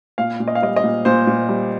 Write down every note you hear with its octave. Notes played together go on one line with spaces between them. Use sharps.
A#2 F5
A#2
D#5
F5
G3 D#5
D#5
A#2
A#2 C5
A#2
G3